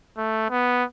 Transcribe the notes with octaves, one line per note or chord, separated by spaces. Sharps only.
A3
B3